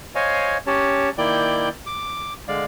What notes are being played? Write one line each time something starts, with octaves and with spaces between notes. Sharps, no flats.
C5 C#5 D#5 F5 G#5
C#4 G4 C#5 A5
D#3 A#3 E4 D5 G5 G6
D6
D3 G#3 D5 F5